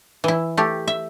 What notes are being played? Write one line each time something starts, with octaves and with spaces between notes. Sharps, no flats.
E3 E4
A3 G4
E5